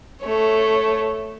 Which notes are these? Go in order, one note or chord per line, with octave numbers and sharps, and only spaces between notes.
A3 C#5